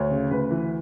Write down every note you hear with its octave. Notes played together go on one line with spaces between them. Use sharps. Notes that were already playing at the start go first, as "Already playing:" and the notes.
Already playing: D2 C#5
C#3
D2 B4
E3